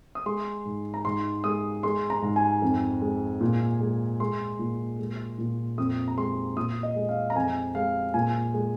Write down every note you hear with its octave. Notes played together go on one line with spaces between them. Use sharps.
D#6
G#3 C6
G#2
A#5
G#2 C6
G#3 D#6
G#3 C6
A#5
G#2
G#5
F2
G#3
A#2
G#3
G#3 C6
A#2
G#3
A#2
F2 D#6
A#5
G#3 C6
A#2 D#6
D#5
G#3
F5
A#5
F2 G#5
G#3 F5
A#2 G#5
G#3